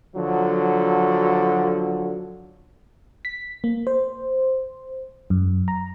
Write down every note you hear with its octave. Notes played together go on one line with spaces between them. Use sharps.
D3 F3 F#3
B6
A#3
C5
F#2
A#5